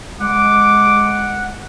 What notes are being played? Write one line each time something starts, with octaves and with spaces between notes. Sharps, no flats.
G#3 F#5 D6